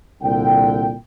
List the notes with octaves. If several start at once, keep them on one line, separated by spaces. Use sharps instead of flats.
C2 A#2 D3 G5